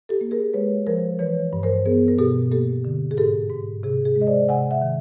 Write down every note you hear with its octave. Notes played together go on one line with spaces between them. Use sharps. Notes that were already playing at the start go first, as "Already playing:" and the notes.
G4 A4
A#3
G#4 A#4
G#3 B4 C#5
F3 A#4 C5
E3 B4 C#5
G2
A#4 C5
B3 G#4 A#4
A#4
B2 G4 A4
A#3 G4 A4
D3
G#4
G#2 G4 A4
G#2
C3 G#4
G#4
G#3
D#5
C5 D5
C3 F#5 G#5
E5 F#5
D#3